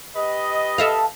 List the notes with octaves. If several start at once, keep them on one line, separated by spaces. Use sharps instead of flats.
G4 B4 D#5
A4 E5 F5